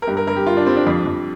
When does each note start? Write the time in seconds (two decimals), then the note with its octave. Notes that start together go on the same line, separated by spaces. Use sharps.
0.02 A#4
0.07 G2 G4
0.17 A#4
0.27 G2 A#4
0.36 G4
0.46 G2 F4
0.57 D4
0.66 G3 C4
0.76 D4
0.87 F2
1.06 F2